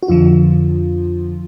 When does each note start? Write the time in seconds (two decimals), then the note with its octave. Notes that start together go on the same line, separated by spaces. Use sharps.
0.03 F#4
0.08 F2 D3 F3 F4